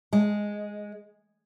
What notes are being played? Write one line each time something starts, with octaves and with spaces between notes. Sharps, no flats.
G#3